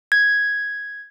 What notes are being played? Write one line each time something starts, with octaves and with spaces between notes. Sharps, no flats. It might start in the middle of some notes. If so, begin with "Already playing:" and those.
G#6